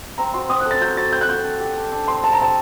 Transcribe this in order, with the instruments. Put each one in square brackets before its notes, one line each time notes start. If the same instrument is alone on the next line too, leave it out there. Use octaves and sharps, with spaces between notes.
[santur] C4 [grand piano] A#5
[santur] F#4 [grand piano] C6
[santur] C4 [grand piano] D#6
[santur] A4 [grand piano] F#6
[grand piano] A6
[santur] F#3 [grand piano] G6
[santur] F#3 [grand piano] A6
[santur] C4 [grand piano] G6
[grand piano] F#6
[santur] F#4 [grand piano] G6
[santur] D4
G4
D4
D4
[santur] C4 [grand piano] C6
[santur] G4 [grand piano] A5
[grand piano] A#5
[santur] C4 [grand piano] A5